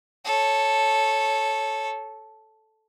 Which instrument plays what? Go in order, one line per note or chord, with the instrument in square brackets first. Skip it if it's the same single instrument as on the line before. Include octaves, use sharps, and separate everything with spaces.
[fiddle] A4 C#5